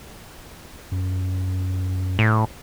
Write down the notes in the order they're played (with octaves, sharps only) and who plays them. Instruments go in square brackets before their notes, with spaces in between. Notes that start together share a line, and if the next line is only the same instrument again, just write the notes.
[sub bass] F#2
[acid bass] A2